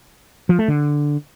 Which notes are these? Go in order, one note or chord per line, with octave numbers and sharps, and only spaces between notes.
F3
A3
D3